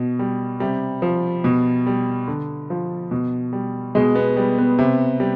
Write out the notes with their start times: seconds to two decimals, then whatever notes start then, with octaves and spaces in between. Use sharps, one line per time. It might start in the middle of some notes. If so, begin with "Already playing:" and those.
Already playing: B2
0.19 G3
0.60 C3 G3
1.02 F3
1.44 B2
1.87 G3
2.28 D3
2.70 F3
3.11 B2
3.53 G3
3.95 B2 G#3
4.15 B3
4.37 G3
4.58 B3
4.79 C3
5.20 G3